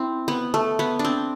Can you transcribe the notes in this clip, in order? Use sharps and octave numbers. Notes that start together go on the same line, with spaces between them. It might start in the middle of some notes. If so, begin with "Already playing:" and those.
Already playing: C4 E4
B3
A3
B3
D4
C4